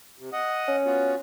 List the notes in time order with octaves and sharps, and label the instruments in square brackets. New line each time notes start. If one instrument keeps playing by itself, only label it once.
[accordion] C3
D#5 F#5 D#6
[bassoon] C#4
[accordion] B3 F4 F#4